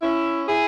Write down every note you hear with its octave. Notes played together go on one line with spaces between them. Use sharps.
C#4 E4
E4 G#4